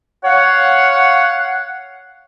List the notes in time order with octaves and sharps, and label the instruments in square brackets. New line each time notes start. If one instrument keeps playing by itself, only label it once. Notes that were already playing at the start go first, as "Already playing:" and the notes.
[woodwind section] C#5 F5 F#5